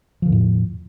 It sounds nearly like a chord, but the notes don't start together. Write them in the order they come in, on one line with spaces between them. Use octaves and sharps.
F3 D3 E2 A2